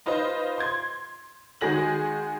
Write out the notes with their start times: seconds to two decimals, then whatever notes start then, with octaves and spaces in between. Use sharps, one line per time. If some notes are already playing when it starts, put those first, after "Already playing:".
0.06 D#4 F4 B4 C5 D#5
0.58 C6 G6 G#6
1.61 D#3 G#3 F#4 G#4 A#6 F#7